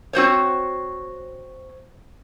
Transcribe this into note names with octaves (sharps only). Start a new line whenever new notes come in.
C4 F#4 C5 C#5